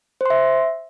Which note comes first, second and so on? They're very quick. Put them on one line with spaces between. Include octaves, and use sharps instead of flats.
C5 C6 E5